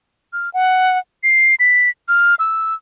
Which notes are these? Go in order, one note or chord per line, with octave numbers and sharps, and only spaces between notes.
F6
F#5
C7
B6
F6
E6